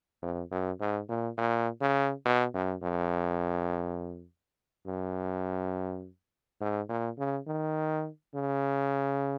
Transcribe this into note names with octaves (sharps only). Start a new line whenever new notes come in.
F2
F#2
G#2
A#2
A#2
C#3
B2
F#2
F2
F#2
G#2
A#2
C#3
D#3
C#3